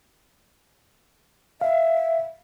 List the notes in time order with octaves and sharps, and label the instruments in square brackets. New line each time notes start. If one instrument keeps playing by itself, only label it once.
[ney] E5 [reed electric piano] F5